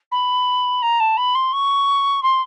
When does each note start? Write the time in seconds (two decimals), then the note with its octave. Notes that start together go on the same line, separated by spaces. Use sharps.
0.11 B5
0.82 A#5
1.00 A5
1.17 B5
1.35 C6
1.52 C#6
2.23 C6